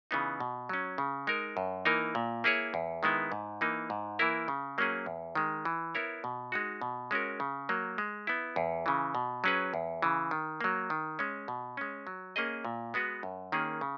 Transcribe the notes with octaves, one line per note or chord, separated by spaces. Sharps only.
C#3 E3 B3 D#4
B2
F#3 C#4
C#3
G#3 D#4 A#4
F#2
E3 A#3 D#4 A#4
A#2
A#3 E4 G#4 C#5
E2
D#3 G#3 B3 E4
G#2
E3 A#3 D#4
G#2
E3 A#3 E4 A#4
C#3
F#3 A#3 C#4 G#4
E2
D#3 G#3
E3
B3 E4 A#4 C#5
B2
G#3 D#4 F#4
B2
G#3 C#4 F#4 A#4
C#3
F#3 A#3
G#3
B3 E4
E2
C#3 E3
B2
F#3 C#4 G#4 B4
E2
C#3 E3
D#3
F#3 A#3
D#3
G#3 C#4
B2
G#3 C#4
F#3
A#3 C#4 G#4 D#5
A#2
G#3 B3 F#4 B4
F#2
D#3 A#3 C#4 G#4
C#3